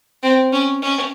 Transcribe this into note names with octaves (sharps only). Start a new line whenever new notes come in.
C4
C#4
C#4